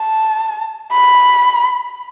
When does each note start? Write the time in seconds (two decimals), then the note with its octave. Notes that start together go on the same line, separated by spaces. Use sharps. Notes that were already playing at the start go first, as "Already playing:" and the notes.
Already playing: A5
0.93 B5